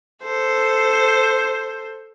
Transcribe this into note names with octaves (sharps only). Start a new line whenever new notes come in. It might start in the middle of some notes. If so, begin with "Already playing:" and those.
A4 C5